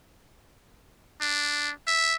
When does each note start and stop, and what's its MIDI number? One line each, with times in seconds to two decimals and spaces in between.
1.21 1.71 62
1.87 2.15 76